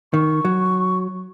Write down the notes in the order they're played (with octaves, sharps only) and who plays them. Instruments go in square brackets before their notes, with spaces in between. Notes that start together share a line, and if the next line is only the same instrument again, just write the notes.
[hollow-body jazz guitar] D#3 [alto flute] C#6
[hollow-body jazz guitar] F#3